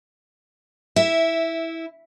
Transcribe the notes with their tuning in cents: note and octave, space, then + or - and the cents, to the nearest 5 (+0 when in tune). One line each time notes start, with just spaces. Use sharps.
E4 -10 E5 +0